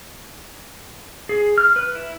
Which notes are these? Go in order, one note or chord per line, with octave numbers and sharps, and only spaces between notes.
G#4
F6
B4
E4